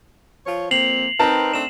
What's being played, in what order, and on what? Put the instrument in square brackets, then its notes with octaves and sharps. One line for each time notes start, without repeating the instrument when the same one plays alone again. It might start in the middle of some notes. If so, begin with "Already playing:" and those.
[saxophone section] F3 F4 C#5
[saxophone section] F2 A#3 C4 [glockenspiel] C7 F7 F#7
[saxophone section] C4 B4 [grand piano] D#4 A#4 A5
[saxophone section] A3 C4 D4 [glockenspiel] E7